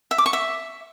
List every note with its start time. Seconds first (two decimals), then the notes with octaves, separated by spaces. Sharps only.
0.11 E5
0.18 D6
0.26 C#6
0.33 E5